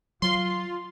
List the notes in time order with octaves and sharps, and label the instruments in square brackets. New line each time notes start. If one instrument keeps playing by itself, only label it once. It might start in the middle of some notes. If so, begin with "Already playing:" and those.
[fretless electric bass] F#3 [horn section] F4 [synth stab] C6